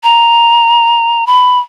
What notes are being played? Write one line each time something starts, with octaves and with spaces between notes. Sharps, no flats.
A#5
B5